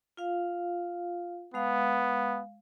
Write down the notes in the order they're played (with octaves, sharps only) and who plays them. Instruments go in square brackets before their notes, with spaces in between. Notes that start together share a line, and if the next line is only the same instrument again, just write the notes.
[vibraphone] F4 F5
[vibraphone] G#3 F5 [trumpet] B3